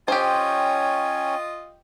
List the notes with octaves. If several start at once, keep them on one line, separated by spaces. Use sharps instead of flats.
C#4 F4 G4 C5 C#5 D#5 G5 G#5